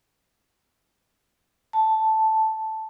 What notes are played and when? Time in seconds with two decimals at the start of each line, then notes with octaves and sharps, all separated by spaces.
1.73 A5